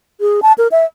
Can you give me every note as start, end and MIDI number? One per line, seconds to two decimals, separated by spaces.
0.21 0.40 68
0.42 0.53 81
0.58 0.68 70
0.72 0.85 76